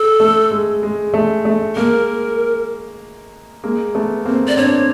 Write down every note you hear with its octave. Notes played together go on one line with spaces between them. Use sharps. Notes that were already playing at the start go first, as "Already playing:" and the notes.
Already playing: A4
A3
G#3
G#3
A3
A3
G#3 A#3 A#4
G#3 A#3
A3 B3
A#3 C4
D5
C4 D4 C#5